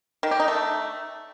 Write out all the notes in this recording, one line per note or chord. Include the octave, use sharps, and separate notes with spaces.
D#3
G4
D#4
A3